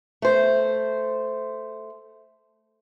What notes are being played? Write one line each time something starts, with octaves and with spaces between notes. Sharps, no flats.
A3 C5